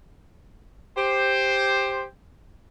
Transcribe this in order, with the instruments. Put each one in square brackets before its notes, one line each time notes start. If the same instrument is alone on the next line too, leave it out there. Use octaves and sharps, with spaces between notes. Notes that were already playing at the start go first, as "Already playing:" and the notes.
[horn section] G4 C5